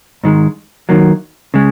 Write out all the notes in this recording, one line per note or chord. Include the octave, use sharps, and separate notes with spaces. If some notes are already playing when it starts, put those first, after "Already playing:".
G#2 D#3 G#3
F#2 D#3 F#3 A#3
C#3 G#3